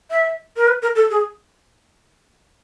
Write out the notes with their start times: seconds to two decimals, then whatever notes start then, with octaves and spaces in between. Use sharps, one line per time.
0.11 E5
0.57 A#4
0.67 B4
0.82 A#4
0.95 A4
1.10 G#4